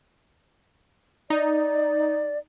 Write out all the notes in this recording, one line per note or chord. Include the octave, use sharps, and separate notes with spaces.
D#4 D5